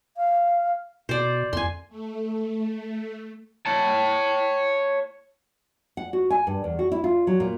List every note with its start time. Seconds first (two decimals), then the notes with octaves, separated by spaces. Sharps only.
0.17 F5
1.09 B2 C5 D5
1.53 F2 G#5 C6
1.89 A3
3.66 C#5 A5
5.97 F#5
6.13 F#4
6.30 G#5
6.47 G2
6.64 E2
6.79 F#4
6.92 E4
7.04 F4
7.27 F#3
7.40 A#2